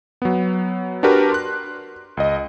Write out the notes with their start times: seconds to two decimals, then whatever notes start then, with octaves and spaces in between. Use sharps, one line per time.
0.22 F#3 B3
1.03 D4 F#4 G4 A#4 B4
1.32 C6 F#6
2.17 C#2 D#5